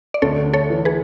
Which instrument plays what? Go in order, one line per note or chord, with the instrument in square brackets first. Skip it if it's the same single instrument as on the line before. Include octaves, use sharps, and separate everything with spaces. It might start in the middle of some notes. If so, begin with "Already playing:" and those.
[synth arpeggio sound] D5
[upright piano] D2 [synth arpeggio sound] A4 C#5
[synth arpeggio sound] A4 C#5
[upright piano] E3
[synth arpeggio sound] G#4 B4